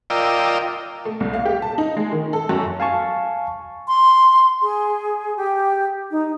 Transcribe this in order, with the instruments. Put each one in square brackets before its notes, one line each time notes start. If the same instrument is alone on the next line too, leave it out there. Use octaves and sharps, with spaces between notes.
[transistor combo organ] F4 A#4 D5 D#5 G5 E6
[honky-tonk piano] A3
C2
F5
G4
A5
D#4
G#3
D#3
A4
F#2
[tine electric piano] F5 G#5 A5 C#6
[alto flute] C6
G#4
G4
D#4